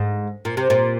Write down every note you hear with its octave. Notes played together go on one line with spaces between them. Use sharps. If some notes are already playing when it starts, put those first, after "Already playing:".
Already playing: G#2
A#2
C3
A#2